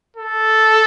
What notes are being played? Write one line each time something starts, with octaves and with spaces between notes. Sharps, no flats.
A4